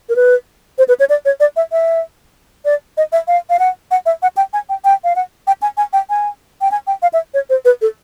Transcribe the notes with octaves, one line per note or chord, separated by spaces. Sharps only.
A#4
B4
C5
B4
C#5
D5
C#5
D5
E5
E5
D5
D#5
E5
F5
F5
F#5
F#5
E5
F#5
G5
G#5
G5
G5
F5
F#5
G5
G#5
G#5
G5
G#5
G5
G#5
G5
F5
E5
C#5
C5
B4
A4